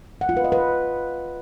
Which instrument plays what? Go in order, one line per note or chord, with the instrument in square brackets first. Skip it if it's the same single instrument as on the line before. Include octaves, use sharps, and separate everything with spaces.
[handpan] F#5
F4
B4
D#5
B4